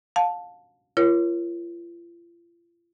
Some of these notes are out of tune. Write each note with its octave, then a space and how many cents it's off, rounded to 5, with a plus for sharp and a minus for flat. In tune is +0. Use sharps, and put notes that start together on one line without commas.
F5 +30 A5 +0
F4 -40 A#4 +30 C#5 -5